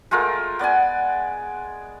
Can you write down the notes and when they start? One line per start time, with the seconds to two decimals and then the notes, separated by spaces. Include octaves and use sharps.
0.11 G#3 A3 F4 A#4
0.59 B3 D5 F#5 G#5